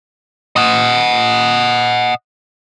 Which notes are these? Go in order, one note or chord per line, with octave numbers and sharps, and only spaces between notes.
D#5 F#5